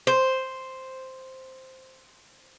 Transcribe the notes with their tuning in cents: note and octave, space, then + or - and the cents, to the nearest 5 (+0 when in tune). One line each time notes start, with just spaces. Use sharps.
C5 +0